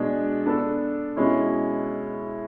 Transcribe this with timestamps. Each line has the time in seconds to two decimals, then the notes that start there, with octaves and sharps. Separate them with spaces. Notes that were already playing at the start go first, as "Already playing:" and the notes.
Already playing: B2 G#3 D4
0.46 B3 D4 A4
1.16 B2 G#3 C#4 E4